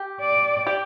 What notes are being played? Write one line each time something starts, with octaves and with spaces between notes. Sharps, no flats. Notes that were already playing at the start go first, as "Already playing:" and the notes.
Already playing: G4
D5
G4